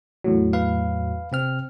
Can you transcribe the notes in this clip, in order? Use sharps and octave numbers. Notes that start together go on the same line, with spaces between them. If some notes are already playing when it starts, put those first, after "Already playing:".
E2 A2 F#3
B4 F5
C3 C4 F6